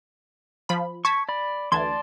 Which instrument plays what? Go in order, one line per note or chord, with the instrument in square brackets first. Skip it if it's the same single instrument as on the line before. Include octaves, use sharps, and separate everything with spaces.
[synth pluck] F3 B5
[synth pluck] A5 G#6 B6 [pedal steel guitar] C#6
[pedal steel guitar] D5 B5
[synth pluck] D2 E3 G#6 [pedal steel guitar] D5 A5 C6